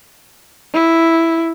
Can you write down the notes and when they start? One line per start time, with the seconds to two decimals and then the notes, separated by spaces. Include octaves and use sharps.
0.74 E4